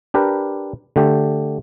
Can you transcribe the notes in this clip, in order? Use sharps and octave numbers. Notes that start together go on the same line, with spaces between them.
D4 G4 A#4 B4
D3 A3 G4